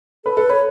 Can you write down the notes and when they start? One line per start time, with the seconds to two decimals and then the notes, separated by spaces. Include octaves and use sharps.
0.25 A4 B4
0.37 A4 B4
0.49 B4 C#5